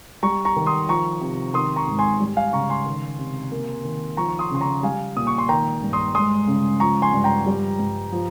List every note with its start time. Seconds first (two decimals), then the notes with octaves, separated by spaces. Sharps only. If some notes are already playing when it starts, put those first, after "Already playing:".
0.23 G3 A#5 C#6
0.45 A#5 C#6
0.56 D#3
0.66 C6 D#6
0.88 F3 A#5 C#6
1.21 C3
1.54 D#3 C6 D#6
1.76 A#5 C#6
1.88 G#2
1.99 G#5 C6
2.21 G3
2.37 F5 G#5
2.53 C#3 A#5 C#6
2.70 G#5 C6
2.86 D#3
3.19 C3
3.52 A#3
3.85 D#3
4.17 F3 A#5 C#6
4.29 C#6
4.39 C6 D#6
4.51 C#3 C6
4.61 A#5 C#6
4.83 G3 F5 G#5
5.16 A#2 D#6
5.27 C#6
5.38 C6
5.49 D#3 G5 A#5
5.82 G2
5.93 C6 D#6
6.15 G#3 C6 D#6
6.47 C#3
6.80 F3 A#5 C#6
7.02 G#5 C6
7.13 G2
7.24 G5 A#5
7.46 G3
7.79 G2
8.12 F3